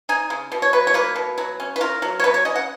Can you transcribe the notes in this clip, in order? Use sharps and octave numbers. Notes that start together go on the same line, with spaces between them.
D#4 G#5
C#3
B2
C#5
F#3 B4
C#5
A#3 B4
B2
F#3
C#4
B4
F4 A#4
F#3
C#5
F#3 B4
C#5
C#4 D#5
F#5